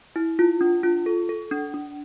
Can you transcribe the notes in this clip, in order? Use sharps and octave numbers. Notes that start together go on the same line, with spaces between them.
E4
F4
D4
F4
A4
A4
D4
D4